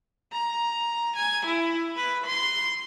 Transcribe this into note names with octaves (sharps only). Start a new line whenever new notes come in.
A#5
G#5
E4
B4
C6